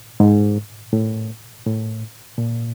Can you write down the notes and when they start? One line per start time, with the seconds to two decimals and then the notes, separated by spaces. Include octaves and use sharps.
0.20 G#2
0.93 A2
1.66 A2
2.38 A#2